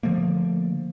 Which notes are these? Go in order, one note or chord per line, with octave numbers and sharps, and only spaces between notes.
D3 F3 A3 A#3